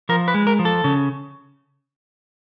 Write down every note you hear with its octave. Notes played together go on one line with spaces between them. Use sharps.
F3 A#4
B4
G#3
A#4
F3
A4
C#3